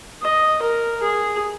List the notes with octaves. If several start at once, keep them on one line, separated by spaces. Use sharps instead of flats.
D#5
A#4
G#4